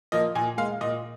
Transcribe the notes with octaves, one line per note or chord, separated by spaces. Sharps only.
F3 A#3 D#5
A#2 G#5
G#3 F5
A#2 D#5